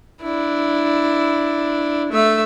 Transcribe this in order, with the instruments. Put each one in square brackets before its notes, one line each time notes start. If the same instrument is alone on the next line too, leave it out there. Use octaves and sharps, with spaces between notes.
[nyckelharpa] D4 E4
A3 E5